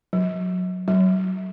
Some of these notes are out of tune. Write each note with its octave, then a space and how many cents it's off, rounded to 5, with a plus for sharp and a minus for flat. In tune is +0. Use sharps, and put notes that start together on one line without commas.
F#3 -15
F#3 +30